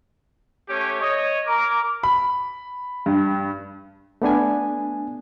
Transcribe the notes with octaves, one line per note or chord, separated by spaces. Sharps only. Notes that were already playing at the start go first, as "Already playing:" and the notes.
A3 C#4 G4 C#5
C#5 D#5
A#4 A#5 D6
B5
G2
A3 B3 D4 G#5